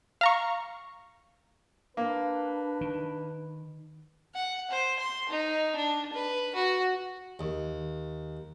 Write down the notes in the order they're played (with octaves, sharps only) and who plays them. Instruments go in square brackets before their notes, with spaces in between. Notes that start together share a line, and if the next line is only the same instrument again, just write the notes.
[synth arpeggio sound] F5 A#5 C#6
[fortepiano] A#3 [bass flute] D4 [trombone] B4
[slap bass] D#3
[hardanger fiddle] F#5
C5
C6
D#4
D4
B4
F#4
[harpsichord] D#2